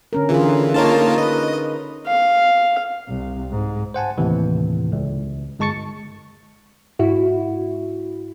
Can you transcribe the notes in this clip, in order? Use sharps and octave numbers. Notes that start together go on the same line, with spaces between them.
D3 C#4 A#4
D3 E3 F4 G#4
A#3 D#4 F4 A#4 C#5 A5
B4 D#5
F5
C2
G#2
C5 F#5 G#5 A5
D#2 A2 C3 E3
C#2
G1 G#3 A5 C#6 A6 C#7
G#2 E4 F#4